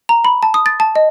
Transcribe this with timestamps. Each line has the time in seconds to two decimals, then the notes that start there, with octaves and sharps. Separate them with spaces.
0.09 A#5
0.25 B5
0.43 A5
0.54 D#6
0.66 A6
0.80 A5
0.96 D#5